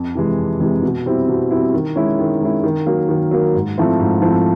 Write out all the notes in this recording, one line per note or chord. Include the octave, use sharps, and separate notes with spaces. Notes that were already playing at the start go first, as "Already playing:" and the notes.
Already playing: F2
C3 E3 G#3
F2
C3 E3 G#3
B2
G3 C4 E4
B2
G3 C4 E4
D#3
G#3 C#4 E4
D#3
G#3 C#4 E4
D#3
F#3 A#3
D#3
F#3 A#3
G#2
F3 A3 C4 E4
G#2
F3 A3 C4 E4